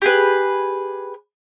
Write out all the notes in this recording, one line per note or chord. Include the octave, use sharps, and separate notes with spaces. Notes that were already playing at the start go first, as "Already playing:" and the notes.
G4 G#4 B4